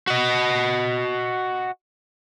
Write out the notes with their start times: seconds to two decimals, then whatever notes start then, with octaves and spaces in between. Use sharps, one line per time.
0.07 F#4 D#5